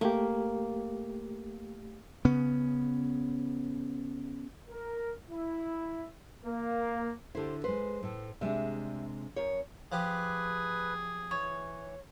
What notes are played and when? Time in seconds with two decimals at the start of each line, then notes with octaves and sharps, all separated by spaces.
0.01 A3 A#3 G4
2.25 C#3 B3 C#4
4.70 A#4
5.30 E4
6.45 A#3
7.35 D3 E4 G4 A4 C5
7.64 G#3 B4 C5
8.03 A2 A3
8.41 C3 G3 G#3 D4 E5
9.36 F#2 C#5
9.92 F3 G4 G#4 B4
11.31 E3 C#5